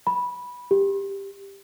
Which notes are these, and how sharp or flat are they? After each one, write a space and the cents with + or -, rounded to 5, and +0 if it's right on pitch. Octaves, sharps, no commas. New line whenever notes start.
B5 -10
G4 +10